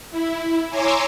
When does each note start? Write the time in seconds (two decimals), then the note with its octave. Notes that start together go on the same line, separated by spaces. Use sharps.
0.11 E4
0.70 C#5 G#5 A#5 C6 D6 E6